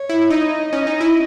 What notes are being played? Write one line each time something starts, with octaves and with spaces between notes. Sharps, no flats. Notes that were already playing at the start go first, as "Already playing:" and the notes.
Already playing: C#5
E4
D#4 D#5
C#4 D#5
D#4
E4